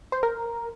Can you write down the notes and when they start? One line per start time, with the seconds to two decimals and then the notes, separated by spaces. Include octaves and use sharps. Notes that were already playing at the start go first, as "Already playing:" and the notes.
0.12 C5
0.23 A#4